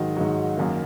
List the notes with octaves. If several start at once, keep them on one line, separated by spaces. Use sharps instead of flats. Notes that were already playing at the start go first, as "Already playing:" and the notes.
Already playing: G#2 D#3 F#3 D#5
G#2 D#3 F#3
F#2 D#3 A#3